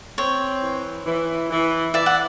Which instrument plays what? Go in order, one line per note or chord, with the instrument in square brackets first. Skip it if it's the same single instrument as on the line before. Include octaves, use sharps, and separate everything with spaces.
[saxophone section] C4 [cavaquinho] C#5
[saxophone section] E3
E3
E3
[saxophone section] E3 [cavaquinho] D5 E5
[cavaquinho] F#5